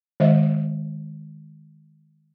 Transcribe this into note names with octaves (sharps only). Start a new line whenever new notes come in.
D#3 G#3 C5 D#5 E5